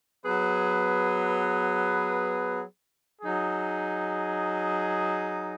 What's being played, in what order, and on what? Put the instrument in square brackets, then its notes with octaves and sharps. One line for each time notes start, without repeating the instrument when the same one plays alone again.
[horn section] F#3 B3 G#4 B4
F#3 D#4 G#4